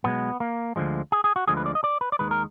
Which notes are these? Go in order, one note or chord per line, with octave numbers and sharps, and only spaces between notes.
B1 B2 G#3 B3
A#3
D2 D3 F3 G#3
G#4
G#4
F#4
D2 D3 F3 G#3 G#4
B4
D5
D#5
D5
B4
D5
D#2 D#3 G#3 B4
A#4